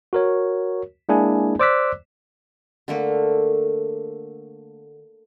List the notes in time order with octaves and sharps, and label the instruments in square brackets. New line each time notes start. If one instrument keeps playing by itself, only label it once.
[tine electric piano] F#4 A#4 C#5
G#3 A#3 D4 E4 G#4 G#5
C5 D5 D6 E6 F#6 B6
[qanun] D3 A3 A#3 A#4